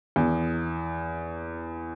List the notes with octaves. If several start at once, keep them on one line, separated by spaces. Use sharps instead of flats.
E2